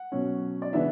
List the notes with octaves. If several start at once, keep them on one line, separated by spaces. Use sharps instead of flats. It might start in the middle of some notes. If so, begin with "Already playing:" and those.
Already playing: F#5
B2 F#3 C#4
D5
C#3 E3 B3 D4 E5